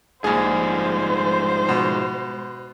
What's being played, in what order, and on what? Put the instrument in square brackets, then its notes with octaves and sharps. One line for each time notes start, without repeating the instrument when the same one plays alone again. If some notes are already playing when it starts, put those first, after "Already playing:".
[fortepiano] A#1 G#4 [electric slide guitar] G#2 F3 G3 [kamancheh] C5
[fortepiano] B2